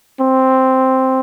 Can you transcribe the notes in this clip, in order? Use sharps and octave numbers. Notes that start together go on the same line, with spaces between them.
C4